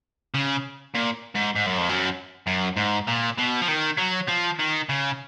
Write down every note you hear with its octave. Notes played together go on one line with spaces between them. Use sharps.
C#3
A#2
G#2
G#2
F#2
F2
F#2
F#2
G#2
A#2
B2
F3
D#3
F#3
F3
D#3
C#3